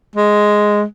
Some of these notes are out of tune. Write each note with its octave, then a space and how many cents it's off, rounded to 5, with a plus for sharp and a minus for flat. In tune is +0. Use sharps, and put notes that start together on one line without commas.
G#3 +0